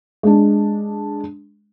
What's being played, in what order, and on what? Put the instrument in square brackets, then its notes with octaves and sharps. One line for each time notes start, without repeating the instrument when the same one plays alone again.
[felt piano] G#3 D4